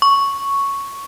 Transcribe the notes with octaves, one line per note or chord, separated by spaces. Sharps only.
C#6